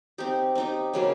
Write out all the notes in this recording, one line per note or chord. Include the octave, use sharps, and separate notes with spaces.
C4 D#4 G4
C4 D#4 G4
C#3 F#3 A#3